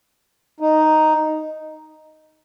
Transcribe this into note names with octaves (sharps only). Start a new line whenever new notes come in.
D#4